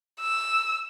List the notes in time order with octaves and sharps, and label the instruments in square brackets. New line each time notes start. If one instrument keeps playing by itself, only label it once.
[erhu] E6